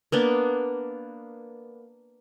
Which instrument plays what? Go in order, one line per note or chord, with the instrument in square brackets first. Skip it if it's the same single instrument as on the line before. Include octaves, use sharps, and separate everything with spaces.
[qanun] A#3 B3 D4